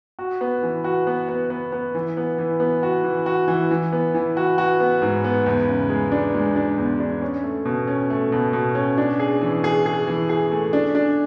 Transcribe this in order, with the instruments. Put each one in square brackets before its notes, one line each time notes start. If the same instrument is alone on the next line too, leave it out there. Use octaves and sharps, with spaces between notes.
[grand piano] F#4
B3
E3
F#4
B3
B3
B3
B3
E3
B3
E3
B3
F#4
E3
F#4
E3
E3
B3
E3
F#4
F#4
B3
G#2
B3
E2
C#3
G#3
D4
G#3
D4
E2
D4
C#4
A3
B2
C#4
A3
B2
B2
C#4
D4
G#4
E3
G#4
G#4
E3
G#4
A3
D4
D4